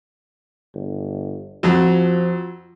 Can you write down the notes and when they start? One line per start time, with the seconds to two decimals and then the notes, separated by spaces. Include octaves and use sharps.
0.74 G1
1.63 F2 F3 F#3